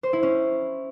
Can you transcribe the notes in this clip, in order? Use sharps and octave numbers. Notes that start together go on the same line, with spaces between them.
C5
E4
C#4